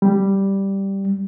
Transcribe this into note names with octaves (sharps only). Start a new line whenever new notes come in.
G3